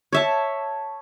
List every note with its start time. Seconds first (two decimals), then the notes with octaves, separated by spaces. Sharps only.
0.13 C#5 E5 A5